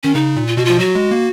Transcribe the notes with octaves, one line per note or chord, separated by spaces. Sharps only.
D#3 C#4
C#3 D#4
A#2
F4
B2 F#4
F3 F4
F#3 F#4
G#3
A#3